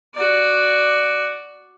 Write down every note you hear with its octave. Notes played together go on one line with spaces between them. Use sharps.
F#4 D5